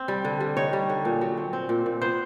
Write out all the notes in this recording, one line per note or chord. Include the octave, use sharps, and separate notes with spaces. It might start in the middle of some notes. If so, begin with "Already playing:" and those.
Already playing: C4
G3
D3
G3
D#4 C#5
G3
D3
A#2
F#3
C4
C4
A#2
A#2
B3 C5